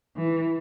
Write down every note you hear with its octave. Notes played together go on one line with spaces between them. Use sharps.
E3